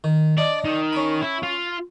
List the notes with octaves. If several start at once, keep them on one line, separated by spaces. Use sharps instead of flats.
D#3
D4 D5 D#5
D#3
C#4 B5
E4
F4